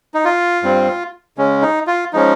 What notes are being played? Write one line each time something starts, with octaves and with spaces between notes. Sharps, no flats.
D#4
F4
G2 G3 C4
C#3 G#3 C#4
D#4
F4
F3 G#3 C#4 D#4